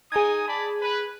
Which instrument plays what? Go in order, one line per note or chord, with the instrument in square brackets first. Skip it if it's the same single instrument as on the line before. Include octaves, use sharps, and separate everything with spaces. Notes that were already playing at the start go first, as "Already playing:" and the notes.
[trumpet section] D#4 G#5 D#6 [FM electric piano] G#4 G#6
[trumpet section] D5 A5 B5
B4